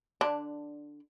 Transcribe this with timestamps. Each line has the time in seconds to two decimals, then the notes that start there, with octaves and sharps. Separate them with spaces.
0.21 D3 D4